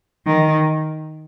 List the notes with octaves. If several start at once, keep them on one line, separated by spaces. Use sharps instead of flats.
D#3